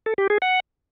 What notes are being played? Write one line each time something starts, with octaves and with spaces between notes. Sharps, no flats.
A4
G4
G#4
F#5